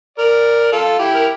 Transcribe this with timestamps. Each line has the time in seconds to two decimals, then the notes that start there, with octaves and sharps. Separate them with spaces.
0.19 A#4 D5
0.72 F4 A4
0.99 E4 G4
1.15 A#4